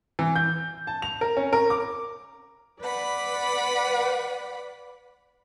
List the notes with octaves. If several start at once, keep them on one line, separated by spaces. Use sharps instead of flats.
E3
G6
A5
F7
A#4
C#4
A#4
D6
B4 D5 F#5 B5